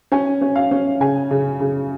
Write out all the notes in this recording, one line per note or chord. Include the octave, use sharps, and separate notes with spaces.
C#4 G#5
C#4
F5
C#4
C#3 G#5
C#3
C#3